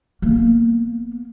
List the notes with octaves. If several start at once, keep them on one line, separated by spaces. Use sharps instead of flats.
A#3 B3